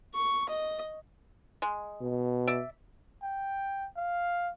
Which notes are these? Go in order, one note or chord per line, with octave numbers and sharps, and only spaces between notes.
C#6
D#5
G#3
B2
D5 E5
G5
F5